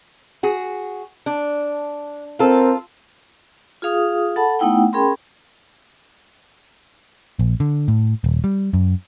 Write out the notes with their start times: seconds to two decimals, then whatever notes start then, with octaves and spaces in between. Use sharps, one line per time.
0.43 F#4 G#4
1.26 D4
2.39 C4 F4 A4 A#4
3.82 F4 G#4 F5 D#6
4.36 A4 F#5 A5 B5
4.59 A3 B3 D#4 E4 F#5 G5
4.93 C#4 G#4 A#4 G5 B5 C6
7.39 A#1
7.60 D3
7.88 A2
8.24 D#1
8.44 G3
8.73 F#2